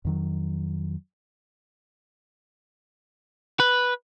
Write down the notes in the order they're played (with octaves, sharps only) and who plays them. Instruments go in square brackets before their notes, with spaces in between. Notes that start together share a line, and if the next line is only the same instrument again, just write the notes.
[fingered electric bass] F2 D#3 F#3
[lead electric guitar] B4